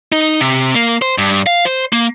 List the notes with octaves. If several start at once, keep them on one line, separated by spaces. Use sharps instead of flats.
D#4
C3
A#3
C5
G2
F5
C5
A#3